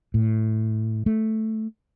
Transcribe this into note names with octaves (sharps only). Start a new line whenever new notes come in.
A2
A3